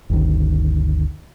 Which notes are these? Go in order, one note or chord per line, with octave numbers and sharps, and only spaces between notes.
G1 D2 D#3